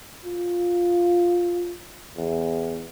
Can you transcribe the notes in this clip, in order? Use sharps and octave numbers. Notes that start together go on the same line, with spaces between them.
F4
E2